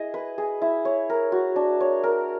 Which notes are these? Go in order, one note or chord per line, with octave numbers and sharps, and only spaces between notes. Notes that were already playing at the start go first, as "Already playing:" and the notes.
Already playing: E4 G#4 D#5
B4
G#4
E4
C#5
A#4
F#4
D4
C#5
A#4